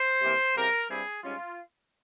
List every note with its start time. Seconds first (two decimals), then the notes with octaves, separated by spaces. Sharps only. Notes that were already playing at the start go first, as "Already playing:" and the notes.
Already playing: C5
0.22 C3 E3 G3 A#3
0.55 C#3 G3 C4 E4 A#4
0.89 G2 G3 C4 E4 G#4
1.22 G#2 G3 C#4 F4